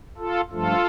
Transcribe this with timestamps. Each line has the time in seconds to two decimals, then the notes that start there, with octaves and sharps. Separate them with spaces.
0.18 F4 A4
0.51 G2 F3 A3 F4 A4